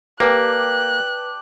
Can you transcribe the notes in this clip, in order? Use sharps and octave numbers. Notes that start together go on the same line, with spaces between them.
A#3 G4 B4 D5 A5 F#6